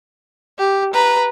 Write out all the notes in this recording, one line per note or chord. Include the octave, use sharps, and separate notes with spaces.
G4
B4 A#5